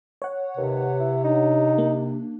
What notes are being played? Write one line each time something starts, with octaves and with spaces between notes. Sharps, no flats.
C#5 F#5
D#2 C3 B4
E4
D4 D#4
A#3